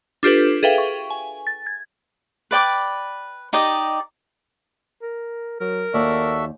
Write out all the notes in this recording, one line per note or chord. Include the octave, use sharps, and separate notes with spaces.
D4 F4 G4 A4 B4
G#4 A4 B4 E5 F5 G5
C#6
G#5
A6
G#6
B4 D5 G5 D6
D#4 G4 D5 D#5
A#4
F#3 A#4
D#2 F#4 A4 D5 E5